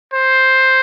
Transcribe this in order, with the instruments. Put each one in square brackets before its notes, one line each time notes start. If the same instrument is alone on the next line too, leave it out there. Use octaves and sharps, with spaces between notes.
[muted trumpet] C5